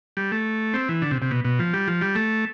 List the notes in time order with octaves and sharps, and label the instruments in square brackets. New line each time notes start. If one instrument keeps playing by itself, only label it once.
[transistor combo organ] G3
A3
C4
E3
D3
C3
C3
B2
B2
F3
G3
F3
G3
A3